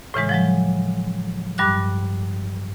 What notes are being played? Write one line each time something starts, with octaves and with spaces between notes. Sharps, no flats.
A2 C#3 E3 G#3
F3 F#3 G#3
G2 G3 D6 F#6